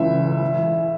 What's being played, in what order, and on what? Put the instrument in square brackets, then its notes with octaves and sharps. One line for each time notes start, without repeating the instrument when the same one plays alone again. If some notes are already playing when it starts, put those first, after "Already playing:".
Already playing: [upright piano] C#2 C#3 E3 [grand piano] E5
[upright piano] E3